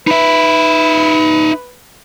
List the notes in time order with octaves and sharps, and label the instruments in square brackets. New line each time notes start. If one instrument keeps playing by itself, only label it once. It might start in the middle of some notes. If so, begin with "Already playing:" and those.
[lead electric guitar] D#4 E5 [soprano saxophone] B4